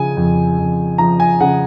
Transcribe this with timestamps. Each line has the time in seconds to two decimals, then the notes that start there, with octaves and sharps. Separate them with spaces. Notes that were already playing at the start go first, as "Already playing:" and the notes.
Already playing: C#3 F3 G#5
0.17 F2
0.58 F2
0.98 F3 A#5
1.20 G#5
1.40 C#3 F#5